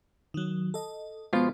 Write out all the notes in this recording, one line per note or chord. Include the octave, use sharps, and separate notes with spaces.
D#3 F#3
A4 D#5
B2 F3 G#3 B3 F4